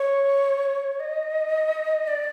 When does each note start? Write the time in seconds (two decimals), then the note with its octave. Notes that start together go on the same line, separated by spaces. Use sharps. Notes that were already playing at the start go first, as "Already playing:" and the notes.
Already playing: C#5
1.00 D#5
2.07 D5